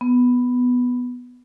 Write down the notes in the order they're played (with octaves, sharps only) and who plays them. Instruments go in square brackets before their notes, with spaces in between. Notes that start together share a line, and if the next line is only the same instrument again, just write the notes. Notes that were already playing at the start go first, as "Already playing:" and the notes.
[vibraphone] B3